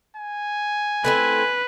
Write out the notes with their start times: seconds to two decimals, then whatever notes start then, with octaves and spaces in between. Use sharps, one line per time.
0.17 G#5
1.04 A3 C4 E4 B4